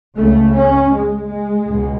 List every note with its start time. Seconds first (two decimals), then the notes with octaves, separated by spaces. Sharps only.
0.16 C#2 C#3 A3
0.54 C#4
0.92 G#3
1.28 G#3
1.65 C#2 B2